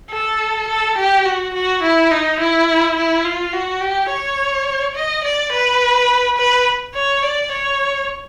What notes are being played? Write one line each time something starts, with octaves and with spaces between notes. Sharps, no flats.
A4
A4
G4
F#4
F#4
E4
D#4
E4
E4
F4
F#4
G4
C#5
D#5
D5
B4
B4
C#5
D5
C#5